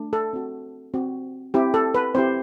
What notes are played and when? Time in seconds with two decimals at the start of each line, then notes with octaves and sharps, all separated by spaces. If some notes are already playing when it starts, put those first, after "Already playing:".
Already playing: A3 D4
0.13 A4
0.33 C4 F#4
0.94 C4 F#4
1.54 C4 E4 G4
1.74 A4
1.95 B4
2.15 C4 E4 G4 C5